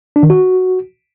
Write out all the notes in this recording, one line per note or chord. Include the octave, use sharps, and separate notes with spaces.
D4
D#3
F#4